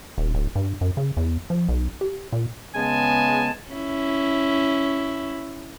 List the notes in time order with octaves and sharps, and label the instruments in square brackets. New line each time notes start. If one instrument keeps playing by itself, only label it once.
[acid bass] D#1
D1
G2
F#2
C#3
E2
F3
B1
G4
A#2
[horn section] C#3 G#3 B3 G#5 A5
[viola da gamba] C#4 E4